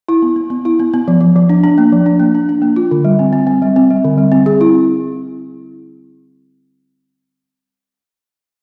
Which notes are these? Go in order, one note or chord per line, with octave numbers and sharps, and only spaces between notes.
E4
B3
B3
B3
E4
B3
B3
F3
F3
F3
D4
D4
A#3
F3
D4
A#3
D4
D4
A#3
F4
D3
G3
C4
C4
C4
G3
C4
G3
D3
G3
C4
G#4
E4